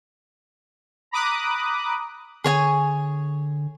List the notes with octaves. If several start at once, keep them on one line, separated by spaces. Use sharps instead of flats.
A#5 B5 D6 D#6 F#6
D3 G#4 C#5 G#5